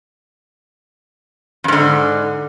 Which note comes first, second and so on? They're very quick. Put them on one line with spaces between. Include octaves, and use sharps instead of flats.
F2 G#2 D3